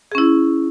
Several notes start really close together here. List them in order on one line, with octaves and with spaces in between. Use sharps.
G#4 C#4 E4